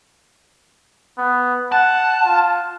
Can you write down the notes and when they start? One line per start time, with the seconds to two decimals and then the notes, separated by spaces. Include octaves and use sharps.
1.18 B3
1.72 F#5 A5
2.26 F4